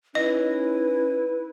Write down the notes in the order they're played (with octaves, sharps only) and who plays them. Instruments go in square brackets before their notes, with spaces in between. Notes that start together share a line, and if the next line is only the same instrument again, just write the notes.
[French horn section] C#4 D#4 [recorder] E4 [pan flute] B4 [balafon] D#5